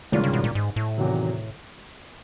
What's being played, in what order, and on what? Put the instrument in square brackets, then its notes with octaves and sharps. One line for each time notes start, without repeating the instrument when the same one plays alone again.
[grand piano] G2 D#3 G#3 C#4 F4 [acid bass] D3
[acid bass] C#3
B2
A#2
G#2
A2
[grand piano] E2 C3 D#3 F#3